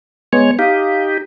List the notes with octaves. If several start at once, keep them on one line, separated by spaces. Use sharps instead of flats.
G#3 B3 C#5
D#4 G4 F5